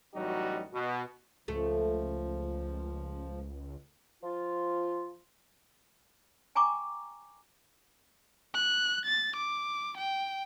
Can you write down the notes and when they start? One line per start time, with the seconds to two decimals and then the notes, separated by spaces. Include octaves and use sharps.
0.14 A1 F#3 G3 D#4 F#4
0.73 B2
1.48 C#2 F3 A3
4.22 F3 F4
6.55 G5 G#5 A#5 C#6 D6
8.54 F#6
9.06 A6
9.37 D6
9.98 G5